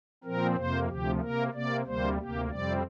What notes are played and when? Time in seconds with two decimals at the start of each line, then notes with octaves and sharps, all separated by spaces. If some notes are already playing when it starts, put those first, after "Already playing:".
0.24 A#2 F3 C4 A#4
0.56 F2 C3 A#3 C5
0.88 D2 C3 F3 G4
1.20 C3 A#3 A#4
1.53 C3 A#3 D5
1.86 D2 C3 G3 A#3 C5
2.18 D2 C3 A#3 G4
2.50 F2 C3 G3 C4 D5